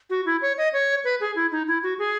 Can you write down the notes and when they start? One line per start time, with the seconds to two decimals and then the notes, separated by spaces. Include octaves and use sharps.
0.10 F#4
0.26 E4
0.42 C#5
0.58 D#5
0.73 C#5
1.04 B4
1.20 G#4
1.36 E4
1.51 D#4
1.67 E4
1.83 F#4
1.98 G#4